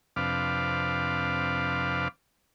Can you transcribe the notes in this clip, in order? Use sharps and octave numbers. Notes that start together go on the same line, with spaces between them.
F2 C3 D4 B4 F5 D6